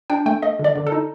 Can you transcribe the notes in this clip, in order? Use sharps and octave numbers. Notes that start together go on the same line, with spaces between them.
D4 G5
A3 G5
A3 D#5
D3
D5
D3
A4
D#4